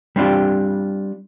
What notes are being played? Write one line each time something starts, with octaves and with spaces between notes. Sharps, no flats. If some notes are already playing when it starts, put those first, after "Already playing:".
G3 C4 D4 F4 G4